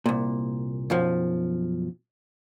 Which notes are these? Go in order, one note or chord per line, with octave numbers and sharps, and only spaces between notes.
C2 A#2
B1 F#2 F3